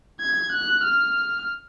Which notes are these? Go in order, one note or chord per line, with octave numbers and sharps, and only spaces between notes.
G#6
F#6
F6